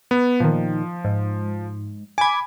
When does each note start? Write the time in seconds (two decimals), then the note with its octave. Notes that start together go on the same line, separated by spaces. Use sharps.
0.11 B3
0.40 A#2 D#3 F3
1.04 G#2
2.18 G#5 B5 D6 G#6